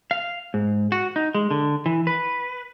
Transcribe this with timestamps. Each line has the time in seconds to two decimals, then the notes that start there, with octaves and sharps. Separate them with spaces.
0.11 F5
0.54 G#2
0.92 F#4
1.16 D#4
1.35 G#3
1.51 D3
1.86 E3
2.07 B4